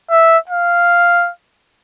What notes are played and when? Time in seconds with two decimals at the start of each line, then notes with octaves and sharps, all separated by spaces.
0.11 E5
0.49 F5